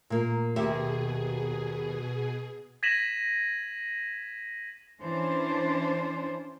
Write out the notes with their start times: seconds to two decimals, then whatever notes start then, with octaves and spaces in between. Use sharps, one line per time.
0.10 A#2 A#3
0.56 D#2 B2 G4 G#4 E5
2.83 G#6 A#6 B6 D#7 E7 F#7
5.01 E3 C#4 D4 C5